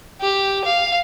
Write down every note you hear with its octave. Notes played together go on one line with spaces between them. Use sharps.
G4
F5